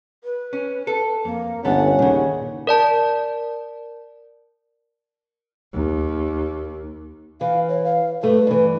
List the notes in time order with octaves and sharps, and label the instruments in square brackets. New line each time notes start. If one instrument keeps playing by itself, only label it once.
[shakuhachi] B4
[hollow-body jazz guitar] C#4
A4
[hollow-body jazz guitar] F2 [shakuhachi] A#3
[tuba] G1 [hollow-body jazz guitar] D2 B3 A4 [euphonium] C#4 [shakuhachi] F#5
[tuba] D#2 [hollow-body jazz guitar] A#2 C#3
[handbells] A#4 D5 A5
[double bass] D#2
[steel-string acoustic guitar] E3 [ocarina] F5
[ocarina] C#5
F5
[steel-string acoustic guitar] G2 A3 [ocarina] B4
[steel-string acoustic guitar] G2 E3